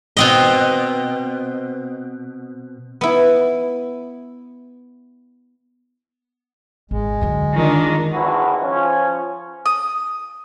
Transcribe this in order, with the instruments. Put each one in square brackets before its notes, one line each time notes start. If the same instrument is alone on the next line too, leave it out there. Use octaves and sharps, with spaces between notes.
[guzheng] B2 C4 D#5
B3 E4
[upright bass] G#1 [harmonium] G#3
[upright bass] F#2 D3
[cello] D#3 [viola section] D4 F4
[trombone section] G#1 E2 B2 E4 F#4
F3 C#4
[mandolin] D#6